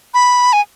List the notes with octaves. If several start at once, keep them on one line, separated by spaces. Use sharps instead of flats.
B5
G#5